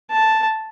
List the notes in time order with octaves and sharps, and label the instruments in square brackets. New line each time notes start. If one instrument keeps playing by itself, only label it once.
[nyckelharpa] A5